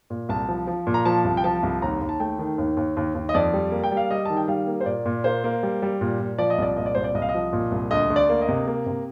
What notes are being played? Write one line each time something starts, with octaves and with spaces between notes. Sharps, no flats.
A#2
C2 A5
F3
F3
A#2
A#5
F3 A5
C2
G5
F3 A5
C2
D#2 A#5
D#2
A5
A3 G5
D#3
D#2
D#2
D#2
D#2
D#5
F2 D5
G3
A#3
G5
G3
F5
G3 D#5
D#3 A5
G5
G3 F5
A#3
C5
A#2 D5
A#2
A#3 C5
A#3
G3
G3
A#2
A#2
F3 D5
D#5
C2 D5
A#2 D#5
D5
C2 C5
D5
C2 D#5
F5
D#5
F3
A#2
C2
D2 D#5
D2
D5
A#3
D#5
C3
A#3
C3